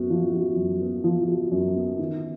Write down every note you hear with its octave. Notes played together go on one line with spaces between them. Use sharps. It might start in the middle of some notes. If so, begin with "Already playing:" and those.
Already playing: F#2 B3 F#4
F3
F#4
F#2
B3
F3
F#4
F#2
B3
D#3